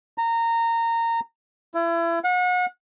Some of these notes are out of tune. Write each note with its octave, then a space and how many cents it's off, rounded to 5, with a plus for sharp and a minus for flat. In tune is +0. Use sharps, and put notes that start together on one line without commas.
A#5 -20
E4 +35
F#5 -35